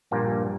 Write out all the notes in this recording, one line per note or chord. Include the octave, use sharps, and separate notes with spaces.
A#1 G2 A#2 G3 A#3